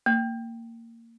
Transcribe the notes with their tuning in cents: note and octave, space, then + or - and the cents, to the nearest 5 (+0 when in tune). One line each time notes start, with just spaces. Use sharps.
A#3 -20